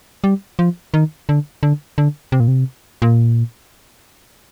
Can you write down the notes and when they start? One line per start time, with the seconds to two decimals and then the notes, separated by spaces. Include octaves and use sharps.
0.24 G3
0.59 F3
0.94 D#3
1.29 D3
1.63 D3
1.98 D3
2.32 C3
2.40 A#2
2.48 C3
3.02 A#2